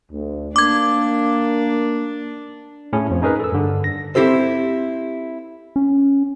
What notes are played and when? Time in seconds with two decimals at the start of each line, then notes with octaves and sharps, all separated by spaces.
0.12 D2
0.56 A#3 D4 D6 G#6
2.93 A2 C#4 E4 G#4
3.10 F2 F3
3.22 C#4 D#4 G#4 A#4 B4
3.40 A4 E6
3.52 G2 D3
3.84 A#6
4.15 C4 E4 G4 A4 C5
5.76 C#4